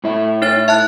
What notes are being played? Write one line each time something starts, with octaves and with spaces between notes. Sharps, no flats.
A2 E4
D#4 C#5 A6
E5 A5 F#6